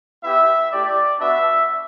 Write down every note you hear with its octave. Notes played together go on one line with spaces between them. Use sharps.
B3 E4 G4 E5
A3 E4 G4 D5
B3 D4 F#4 E5